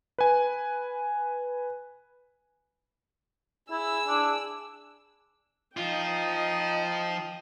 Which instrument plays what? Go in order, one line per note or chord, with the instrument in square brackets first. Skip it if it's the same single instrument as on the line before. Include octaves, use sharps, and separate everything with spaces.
[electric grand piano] B4 G#5
[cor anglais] E4 [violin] G#4 E6
[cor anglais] D4
[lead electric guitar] F3 F4 [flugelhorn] D#4 [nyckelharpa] D#5 G5